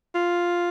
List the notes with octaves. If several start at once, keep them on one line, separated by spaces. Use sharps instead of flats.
F4